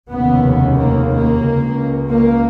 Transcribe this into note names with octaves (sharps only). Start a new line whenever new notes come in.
F1 D#2 C#3 B3
A#3
A#3
C#2 C#3
A#3